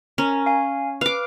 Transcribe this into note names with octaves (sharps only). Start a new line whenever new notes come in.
C#4 A#4 A#5
F5 G#5
B4 F5 D6